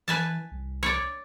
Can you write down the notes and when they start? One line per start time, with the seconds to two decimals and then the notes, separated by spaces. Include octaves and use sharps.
0.08 E3 B4 G#5 A5
0.51 C2
0.83 C#5 D5